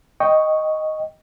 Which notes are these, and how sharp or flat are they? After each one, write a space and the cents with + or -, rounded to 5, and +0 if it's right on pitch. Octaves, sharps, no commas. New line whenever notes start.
D#5 +0 G5 +0 C#6 +0